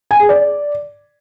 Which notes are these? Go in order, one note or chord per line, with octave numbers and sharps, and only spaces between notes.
G#5
G#4
D5